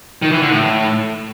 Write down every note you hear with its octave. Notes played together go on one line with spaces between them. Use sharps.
D#3
E3
D3
A2